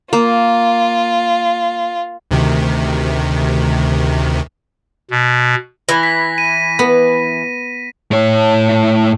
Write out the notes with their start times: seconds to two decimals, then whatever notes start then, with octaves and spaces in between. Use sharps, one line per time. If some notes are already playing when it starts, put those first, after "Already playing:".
0.13 A#3 F4
2.31 D2 C3 D#3
5.11 B2
5.89 E3 A#6
6.03 B6
6.38 D#7
6.79 B3
8.11 A2 C#5